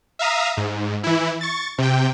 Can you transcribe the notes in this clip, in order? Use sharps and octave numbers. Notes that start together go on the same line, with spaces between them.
E5 F5 A#5 D#6
G#2
E3 E4
C#6 A6
C3 G5